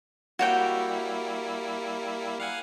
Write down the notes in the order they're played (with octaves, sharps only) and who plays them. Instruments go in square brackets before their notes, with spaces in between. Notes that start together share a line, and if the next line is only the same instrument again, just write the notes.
[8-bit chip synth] G3 A#3 E4 [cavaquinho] F#4 C#5 G5
[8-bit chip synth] F5 F#5 G#5